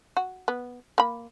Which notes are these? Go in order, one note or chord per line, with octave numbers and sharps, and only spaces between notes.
F#4
B3
A#3 B5